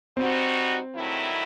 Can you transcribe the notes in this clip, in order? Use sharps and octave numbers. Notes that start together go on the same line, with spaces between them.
B2 G3 C4 D#4 F#4
G2 D#3 F#3 A3 E4